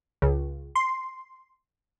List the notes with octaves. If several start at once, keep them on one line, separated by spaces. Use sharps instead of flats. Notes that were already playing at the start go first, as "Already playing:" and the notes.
C#2
C6